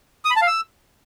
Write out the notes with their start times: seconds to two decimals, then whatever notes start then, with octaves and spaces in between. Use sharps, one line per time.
0.25 D#6
0.31 B5
0.36 A5
0.42 F5
0.47 E6